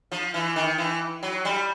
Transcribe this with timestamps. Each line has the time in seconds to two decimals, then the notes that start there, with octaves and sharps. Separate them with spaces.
0.12 F3
0.34 E3
0.56 D#3
0.78 E3
1.23 F#3
1.45 G3